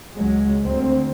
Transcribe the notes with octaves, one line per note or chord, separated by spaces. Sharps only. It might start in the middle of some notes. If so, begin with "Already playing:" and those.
C#2 F#3 G#3
D2 C4